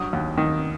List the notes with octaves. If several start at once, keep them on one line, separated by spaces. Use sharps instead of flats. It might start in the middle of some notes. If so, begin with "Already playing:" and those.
Already playing: G2 F#3 D#6
D#2
D#3